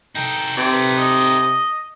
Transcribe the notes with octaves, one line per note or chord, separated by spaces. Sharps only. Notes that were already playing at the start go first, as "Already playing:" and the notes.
D#4 A4 G5
C3 D5
B4
D#5